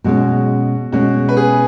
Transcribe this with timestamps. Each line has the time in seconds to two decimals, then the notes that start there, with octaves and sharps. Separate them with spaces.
0.04 B2 G#3 C#4 F#4
0.92 B2 G#3 C#4 F#4
1.29 B4
1.37 G#4